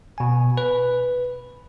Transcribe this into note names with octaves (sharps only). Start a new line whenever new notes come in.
B2 G#5
B4